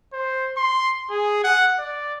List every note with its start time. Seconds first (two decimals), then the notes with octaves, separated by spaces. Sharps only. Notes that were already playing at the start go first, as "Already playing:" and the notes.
0.13 C5
0.57 C6
1.10 G#4
1.44 F#5
1.79 D5